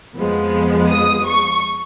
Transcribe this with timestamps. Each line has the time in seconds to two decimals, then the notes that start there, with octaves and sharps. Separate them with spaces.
0.16 F2 F3 G#3 B3
0.90 D#6
1.27 C#6